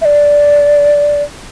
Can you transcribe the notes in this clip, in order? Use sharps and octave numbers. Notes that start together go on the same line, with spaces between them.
E5
D5